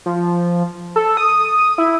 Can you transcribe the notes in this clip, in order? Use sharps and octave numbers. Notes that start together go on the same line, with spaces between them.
F3
A4
D#6
E4